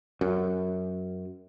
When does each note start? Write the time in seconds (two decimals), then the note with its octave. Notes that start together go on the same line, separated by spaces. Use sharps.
0.21 F#2